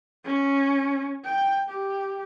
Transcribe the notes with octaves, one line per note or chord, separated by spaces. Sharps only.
C#4
G5
G4